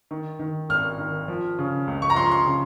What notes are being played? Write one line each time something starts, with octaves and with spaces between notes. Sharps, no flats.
D#3
D#3
G#1 F6
D#3
F3
C#3
C#2
C#6
A#5
F3 C6
C6
C#3